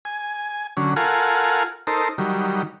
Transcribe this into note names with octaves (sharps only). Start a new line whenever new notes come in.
G#5
D3 F#3 C#4
F4 A4 A#4 F5 F#5 G#5
D#4 A4 A#4 C5
D#3 F#3 G3